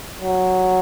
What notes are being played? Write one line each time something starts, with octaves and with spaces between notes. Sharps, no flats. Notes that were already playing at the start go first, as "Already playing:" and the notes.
F#3